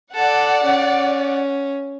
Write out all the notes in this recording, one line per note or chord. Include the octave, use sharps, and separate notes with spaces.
A4 D5 F#5
C#4